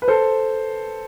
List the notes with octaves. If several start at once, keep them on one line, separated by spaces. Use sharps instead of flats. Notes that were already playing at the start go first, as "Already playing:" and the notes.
B4
A4 C5